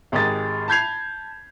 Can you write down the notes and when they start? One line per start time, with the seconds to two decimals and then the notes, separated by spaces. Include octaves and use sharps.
0.12 G#1 G#3 G4 A#4 D#6 A6
0.68 A5 B5 G6 G#6 C7 F7